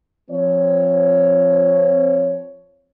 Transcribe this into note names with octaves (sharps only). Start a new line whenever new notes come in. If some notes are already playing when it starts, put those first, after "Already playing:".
F3 C4 C#5